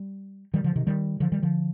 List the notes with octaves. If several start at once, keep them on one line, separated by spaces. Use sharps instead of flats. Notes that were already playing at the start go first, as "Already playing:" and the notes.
Already playing: G3
D#3 G3
D3 F3
C3 D#3
D#3 G3
D3 F3
D#3 G3
D3 F3